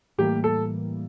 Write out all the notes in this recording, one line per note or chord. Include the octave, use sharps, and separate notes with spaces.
A2 E3 G3 A#3 G4
A4